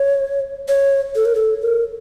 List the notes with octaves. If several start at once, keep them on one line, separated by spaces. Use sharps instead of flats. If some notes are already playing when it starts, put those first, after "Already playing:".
Already playing: C#5
C#5
A4
A#4
A4
A#4